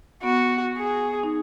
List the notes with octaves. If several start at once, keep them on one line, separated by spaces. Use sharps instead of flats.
B3 F#4
G#4
D#4